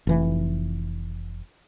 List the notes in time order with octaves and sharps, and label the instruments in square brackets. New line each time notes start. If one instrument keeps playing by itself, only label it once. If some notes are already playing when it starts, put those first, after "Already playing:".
[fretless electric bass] F1 E3